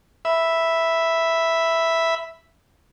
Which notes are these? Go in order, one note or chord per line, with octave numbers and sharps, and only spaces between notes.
E5 B5